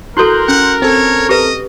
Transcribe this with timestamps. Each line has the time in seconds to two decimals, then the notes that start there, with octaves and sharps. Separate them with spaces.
0.17 E4 F#4 A4 A#4 C6 F#6 G6
0.48 C#4 F#5
0.82 C4 A4 C#5
1.29 G4 B4 D#5